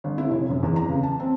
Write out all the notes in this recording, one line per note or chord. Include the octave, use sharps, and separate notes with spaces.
G1
E4
F1
F#2
E2
A#5
C#3
A5
C4